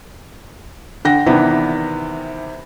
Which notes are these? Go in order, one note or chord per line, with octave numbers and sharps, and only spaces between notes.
D3 G5 A#6
C3 D#3 E3 B3 D4